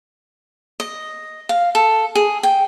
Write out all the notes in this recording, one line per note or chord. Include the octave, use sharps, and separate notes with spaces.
D#5
F5
A4
G#4
G5